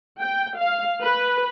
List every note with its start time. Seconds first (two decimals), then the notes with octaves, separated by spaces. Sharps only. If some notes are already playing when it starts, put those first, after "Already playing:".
0.20 G5
0.59 F5
1.02 B4